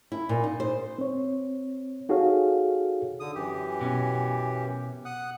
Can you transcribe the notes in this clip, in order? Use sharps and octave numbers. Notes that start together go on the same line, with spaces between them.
E4
A#2
D#4
C5
C4 C#5
D#4 F#4 G#4 A4 C#5 F5
D3 D#6
F#2 E3 G4
B2 C#4
F#5 D#6 F#6